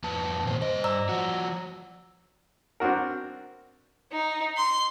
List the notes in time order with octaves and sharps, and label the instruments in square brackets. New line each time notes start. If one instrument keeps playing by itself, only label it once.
[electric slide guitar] F2 B4 A5
A#2 D#3 C5
[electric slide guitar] G2 D#5 [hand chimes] C5
[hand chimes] D5 A#5 E6
[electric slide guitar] F3 F#4
[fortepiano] C4 D4 F#4 A#4
[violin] D#4
C6